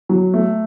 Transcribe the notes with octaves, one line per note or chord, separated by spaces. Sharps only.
F#3
A3